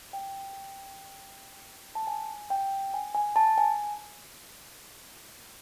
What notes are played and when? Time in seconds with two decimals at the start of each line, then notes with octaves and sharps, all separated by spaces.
0.13 G5
1.95 A5
2.07 G#5
2.50 G5
2.94 G#5
3.15 G#5
3.36 A5
3.58 G#5